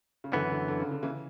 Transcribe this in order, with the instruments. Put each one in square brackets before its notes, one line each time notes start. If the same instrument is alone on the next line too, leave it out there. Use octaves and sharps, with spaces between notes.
[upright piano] C#3
[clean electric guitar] F#2 E3 B3 [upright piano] D3
[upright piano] D3
D3
C#3
D3
C#3 E3